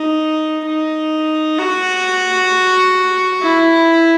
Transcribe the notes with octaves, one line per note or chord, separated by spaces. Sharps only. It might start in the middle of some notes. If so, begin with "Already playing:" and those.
Already playing: D#4
D#4
F#4
E4